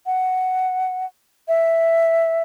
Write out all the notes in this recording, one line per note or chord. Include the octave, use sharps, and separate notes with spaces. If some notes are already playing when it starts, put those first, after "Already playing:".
F#5
E5